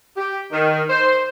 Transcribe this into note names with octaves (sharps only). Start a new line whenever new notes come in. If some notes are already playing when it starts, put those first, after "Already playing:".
G4
D#3
C5